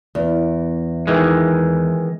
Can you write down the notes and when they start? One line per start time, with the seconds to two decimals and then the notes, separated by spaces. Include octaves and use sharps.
0.15 E2
1.07 D#3 E3 G#3